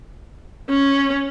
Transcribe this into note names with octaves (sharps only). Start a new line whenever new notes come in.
C#4